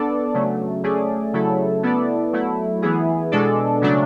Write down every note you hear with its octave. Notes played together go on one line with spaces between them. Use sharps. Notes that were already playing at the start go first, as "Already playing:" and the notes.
Already playing: B3 D4 A4 D5
C#3 F#3 A3
A3 C#4 G#4 D5
C#3 F#3 A3 E4 A4
B3 E4 A4 D5
F#3 A3 E4
E3 B3 E4 G#4
B2 G#3 D4 A4 D5
C#3 F#3 A3 D4